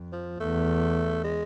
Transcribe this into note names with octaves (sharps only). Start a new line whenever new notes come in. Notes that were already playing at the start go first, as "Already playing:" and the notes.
Already playing: F2
F3
E2 A3
G#3